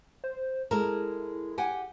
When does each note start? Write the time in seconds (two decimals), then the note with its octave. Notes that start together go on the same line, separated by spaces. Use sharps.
0.24 C5
0.71 G#3 E4 A4 A#4
1.58 G4 F#5 G#5